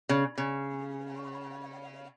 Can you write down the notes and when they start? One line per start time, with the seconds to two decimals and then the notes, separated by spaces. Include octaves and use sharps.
0.09 C#3
0.38 C#3